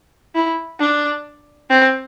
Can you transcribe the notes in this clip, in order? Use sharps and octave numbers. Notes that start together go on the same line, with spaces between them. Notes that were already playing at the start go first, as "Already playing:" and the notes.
E4
D4
C4